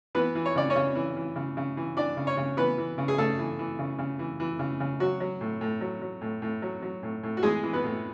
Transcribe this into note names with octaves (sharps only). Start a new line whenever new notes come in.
E3 B3 B4
E3
C#5
C#3 D5
C#4 C#5
C#3
E3
E3
C#3
C#3
E3
E3 D4 D5
C#3
C#4 C#5
C#3
E3 B3 B4
E3
C#3
G#4
C#3 A3 A4
E3
E3
C#3
C#3
E3
E3
C#3
C#3
F#3 F#4
F#3
A2
A2
F#3
F#3
A2
A2
F#3
F#3
A2
A2
F#4
E3 G#3 G#4
E3
B3 B4
A2